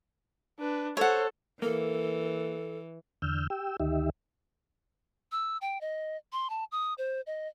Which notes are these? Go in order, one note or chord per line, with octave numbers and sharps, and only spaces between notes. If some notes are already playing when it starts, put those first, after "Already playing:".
D4 B4
A4 C5 C#5 F#5
E3 A#3 A4
E2 D3 E6 F6 G6
G4 G5 E6
D2 D#3 D#4 G4 E5
E6
G5
D#5
C6
A5
D#6
C5
D#5